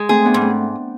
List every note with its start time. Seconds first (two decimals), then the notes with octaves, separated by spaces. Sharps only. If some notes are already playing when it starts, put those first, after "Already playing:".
Already playing: G#3
0.09 A3 C4 G#4
0.25 B3 D4
0.34 G#2
0.41 A3 C4